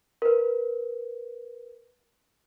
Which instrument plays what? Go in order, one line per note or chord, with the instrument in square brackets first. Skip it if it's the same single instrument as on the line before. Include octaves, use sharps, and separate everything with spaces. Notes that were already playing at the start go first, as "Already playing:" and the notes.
[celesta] A#4 B4